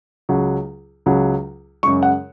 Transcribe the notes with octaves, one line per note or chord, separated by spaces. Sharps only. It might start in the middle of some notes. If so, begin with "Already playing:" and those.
C#2 C#3 F#3
C#2 C#3 F#3
F#2 C#3 G#3 C#6
F#5